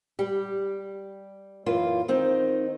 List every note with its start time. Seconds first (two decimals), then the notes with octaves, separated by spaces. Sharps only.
0.19 G3 G4
1.66 F#2 E3 A#3 F4
2.08 D#3 C4 D#4